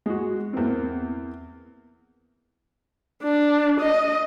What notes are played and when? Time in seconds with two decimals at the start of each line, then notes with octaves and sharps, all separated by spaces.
0.06 G#3 F#4
0.53 E2 A#3 C4
3.23 D4
3.80 D#5